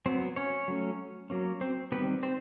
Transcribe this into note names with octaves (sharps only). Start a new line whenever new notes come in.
F#3 B3 C4 C5
C#4 C#5
F#3 A3 C#4
F#3 A#3 C#4
C4 C5
D#3 G3 B3 C4 B4
C4 C5